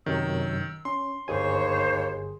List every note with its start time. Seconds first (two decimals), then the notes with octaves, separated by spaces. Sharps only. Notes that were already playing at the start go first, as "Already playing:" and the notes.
0.06 F#2 C3 D#3 F#3 E6
0.85 C#4 C6
1.28 G1 D#2 G#4 C5 C#5 G#5 C#6